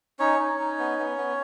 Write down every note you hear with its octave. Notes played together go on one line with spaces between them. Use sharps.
C#4 D#4 C#5
D#4
D#4
B3
B3
B3